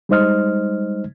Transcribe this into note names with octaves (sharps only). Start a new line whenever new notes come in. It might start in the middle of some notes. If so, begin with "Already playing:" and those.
G3 G#3 D#4 C5 D#5 F6